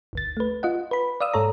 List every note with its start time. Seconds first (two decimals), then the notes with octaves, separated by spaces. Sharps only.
0.13 G1 D2 A6
0.37 A3 B4
0.63 F4 D#5 F#5
0.91 B4 B5
1.21 D5 F5 D#6 E6
1.34 G#2 A4 C#5 A#5